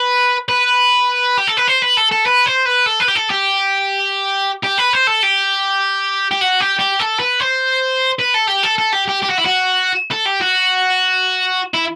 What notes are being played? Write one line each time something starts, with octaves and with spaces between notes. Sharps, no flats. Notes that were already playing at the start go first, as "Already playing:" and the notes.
Already playing: B4
B4
G4
A4
B4
C5
B4
A4
A4
B4
C5
B4
A4
B4
G4
A4
G4
G4
B4
C5
A4
G4
G4
F#4
G4
G4
A4
B4
C5
B4
A4
G4
A4
A4
G4
G4
G4
F#4
E4
F#4
A4
G4
F#4
E4